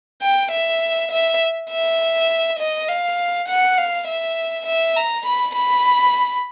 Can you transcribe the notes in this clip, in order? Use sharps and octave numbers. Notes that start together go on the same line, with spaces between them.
G5
E5
E5
E5
D#5
F5
F#5
F5
E5
E5
A#5
B5
B5